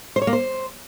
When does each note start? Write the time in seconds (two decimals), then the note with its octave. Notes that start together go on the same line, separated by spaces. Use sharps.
0.16 C5
0.22 C#5
0.27 A#3
0.33 C5